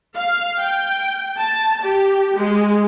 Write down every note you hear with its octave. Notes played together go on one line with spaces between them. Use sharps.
F5
G5
A5
G4
G#3